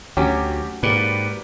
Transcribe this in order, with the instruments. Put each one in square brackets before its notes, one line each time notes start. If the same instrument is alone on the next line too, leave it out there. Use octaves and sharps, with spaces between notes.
[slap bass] D2 [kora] F#3 C#4 [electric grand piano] G4
[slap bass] G#2 [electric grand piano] A#3 G4 B4 [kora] D5